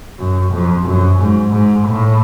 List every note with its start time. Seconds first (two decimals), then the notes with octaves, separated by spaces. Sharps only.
0.19 F#2
0.52 F2
0.86 F#2
1.19 G#2
1.53 G#2
1.87 A2